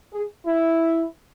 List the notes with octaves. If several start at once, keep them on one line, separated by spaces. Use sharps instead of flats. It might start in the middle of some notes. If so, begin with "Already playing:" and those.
G#4
E4